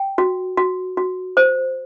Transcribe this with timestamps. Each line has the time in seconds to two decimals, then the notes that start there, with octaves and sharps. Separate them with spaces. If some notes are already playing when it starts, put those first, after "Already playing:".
Already playing: G5
0.18 F#4
0.57 F#4
0.97 F#4
1.37 C5